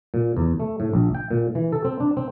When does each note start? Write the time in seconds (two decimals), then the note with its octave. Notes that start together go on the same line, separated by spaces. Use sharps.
0.14 A#2
0.37 E2
0.60 A3
0.80 A2
0.93 A#1
1.15 G5
1.31 A#2
1.55 E3
1.72 A4
1.85 C4
2.00 D4
2.17 C4